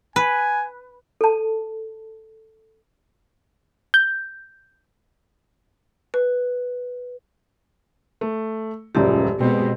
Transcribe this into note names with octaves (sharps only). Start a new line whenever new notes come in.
B4 G#5
A4 A5
G6
B4
A3
D#1 C#2 F#2 F3 G4 D5
B2 G#3 C4